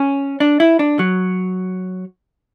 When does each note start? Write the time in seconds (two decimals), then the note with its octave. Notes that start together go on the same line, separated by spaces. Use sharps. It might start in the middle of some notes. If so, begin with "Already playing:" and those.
Already playing: C#4
0.40 D4
0.60 E4
0.79 D4
0.99 F#3